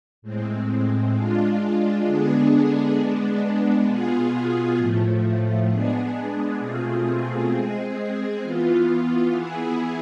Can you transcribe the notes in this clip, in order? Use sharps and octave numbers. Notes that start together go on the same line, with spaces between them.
A2 G#3 C4
G#3 D4 F4
D3 G#3 B3 D4 G#4
G#3 B3 D4
B2 B3 F4 G#4
A2 F3 A3
G#3 B3 D4 G#4
B2 A3 C4 F4 G#4
G#3 C4 G#4
E3 B3 F4
E3 B3 E4 G#4